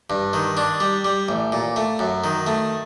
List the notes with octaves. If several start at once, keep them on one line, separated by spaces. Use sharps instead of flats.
G2
D#3
D4
G3
G3
A1
A#2
A3
F#2
D#3
A3